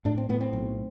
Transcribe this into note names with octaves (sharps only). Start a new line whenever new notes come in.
A2 D4
C4
A2 B3
C4
B1